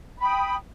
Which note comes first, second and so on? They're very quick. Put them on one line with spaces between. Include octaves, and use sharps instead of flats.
B5 G5 D#6